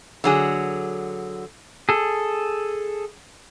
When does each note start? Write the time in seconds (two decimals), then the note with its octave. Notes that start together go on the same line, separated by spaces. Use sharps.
0.24 D3 F#3 G#4
1.89 G#4 A4